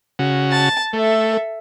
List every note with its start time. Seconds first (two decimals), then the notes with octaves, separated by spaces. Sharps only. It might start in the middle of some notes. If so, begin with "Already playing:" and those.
0.19 C#3 F#4
0.51 A5
0.93 A3 A4 E5